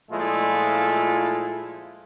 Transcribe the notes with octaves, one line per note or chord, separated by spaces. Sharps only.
A#2 F3 G#3 A3 E4 F4